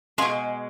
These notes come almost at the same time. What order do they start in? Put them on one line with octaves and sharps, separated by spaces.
G#3 F4 G#4 B2